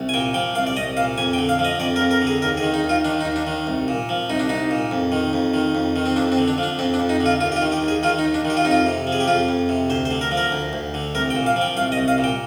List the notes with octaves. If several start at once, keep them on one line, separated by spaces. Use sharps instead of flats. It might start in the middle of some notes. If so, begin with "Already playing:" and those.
Already playing: C2
G#5
A#2 G5
F3 G5
C2 F5
D5
C2 D#5
A#2 F5
F2 G#5
G5
D3
F5
F3
D#5
F2 D5
A#4
F2
A#4
D3
G#4
D#2 A#4
G#4
D#3
D#4
D#2
F4
D#3 D4
D#4
D#2
D4
D#3
C2
A#2
F3
C2 D#4
D4
C2 D#4
A#2
F2
D#3
F2
D#3
F2
D#3
C4
F2 D4
C4
D3
D4
F3
D4
F2 C4
D4
F2
D#4
D3
F4
D#2 F4
G4
F4
D#3
G4
D#2
G#4
D#3 F4
D#4
D#2
D4
D#3
G4
F4
F2 D#4
F4
C3
F3
G#4
G4
F2 F4
F2
C3
D2 C5
C5
D3
A#4
F3
A#4
D2
D2
D3
C2 A#4
G5
A#2
F5
F3
G5
C2 F5
D#5
C2
F5
A#2
G5